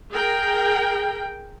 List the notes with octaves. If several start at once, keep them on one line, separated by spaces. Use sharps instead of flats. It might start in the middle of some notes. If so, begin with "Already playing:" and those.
G#4 A#4 G5